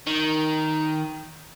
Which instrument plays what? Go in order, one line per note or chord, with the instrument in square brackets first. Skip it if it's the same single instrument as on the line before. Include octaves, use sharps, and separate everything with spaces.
[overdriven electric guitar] D#3